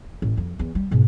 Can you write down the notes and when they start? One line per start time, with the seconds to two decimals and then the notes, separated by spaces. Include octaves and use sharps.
0.22 A1
0.37 F2
0.59 E2
0.75 G3
0.91 G#2 B2